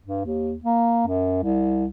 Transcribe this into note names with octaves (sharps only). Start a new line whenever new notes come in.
G2
D#2
A#3
F#2
C2